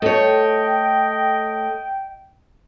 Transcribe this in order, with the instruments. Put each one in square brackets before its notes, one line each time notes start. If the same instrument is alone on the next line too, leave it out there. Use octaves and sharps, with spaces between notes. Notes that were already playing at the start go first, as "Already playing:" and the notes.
[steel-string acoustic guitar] A3 C#5 [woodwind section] D#5 G5